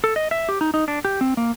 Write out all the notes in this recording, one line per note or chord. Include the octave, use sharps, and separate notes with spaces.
A4
D#5
E5
G4
D#4
D#4
D4
G4
C4
A#3